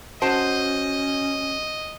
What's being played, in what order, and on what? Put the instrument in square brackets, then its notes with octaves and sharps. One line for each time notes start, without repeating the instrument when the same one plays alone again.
[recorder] C#4 [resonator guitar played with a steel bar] F#4 C5 [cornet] D#5 [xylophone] A5 E7